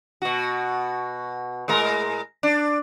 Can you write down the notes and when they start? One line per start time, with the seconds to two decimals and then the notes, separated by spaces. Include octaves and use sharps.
0.22 B2 F#4
1.68 A2 G#3 A#4
2.43 D4